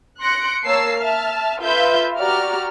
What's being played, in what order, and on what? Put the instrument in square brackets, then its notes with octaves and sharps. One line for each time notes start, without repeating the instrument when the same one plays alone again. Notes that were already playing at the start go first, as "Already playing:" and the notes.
[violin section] C6 F#6 A#6 C#7 D7
A#3 A#4 C#5 A5 E6 C7
E5 A5 F6
F4 A4 B4 E5 F5 G6
F#4 G4 D5 A#5 F6